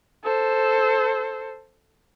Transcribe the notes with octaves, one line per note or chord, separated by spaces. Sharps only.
A4 C5